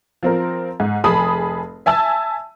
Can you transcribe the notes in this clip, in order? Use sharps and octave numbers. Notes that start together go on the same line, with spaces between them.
F3 C4 A#4
G#2
F1 G#4 A5 B5 D#6
E5 G#5 A5 E6